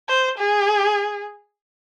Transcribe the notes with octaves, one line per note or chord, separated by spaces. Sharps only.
C5
G#4